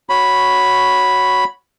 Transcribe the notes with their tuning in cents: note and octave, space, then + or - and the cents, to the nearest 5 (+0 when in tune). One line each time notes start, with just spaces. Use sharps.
F#4 -5 C#5 +0 B5 +0